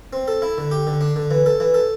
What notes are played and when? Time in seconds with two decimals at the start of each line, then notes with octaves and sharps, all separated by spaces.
0.13 C4
0.28 A4
0.42 E4
0.58 D3
0.71 G4
0.87 D3
1.01 D4
1.16 D3
1.31 E3
1.46 A4
1.60 E3
1.74 A4